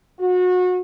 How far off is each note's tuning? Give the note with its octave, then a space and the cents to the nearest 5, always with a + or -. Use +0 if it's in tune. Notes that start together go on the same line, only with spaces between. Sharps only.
F#4 -30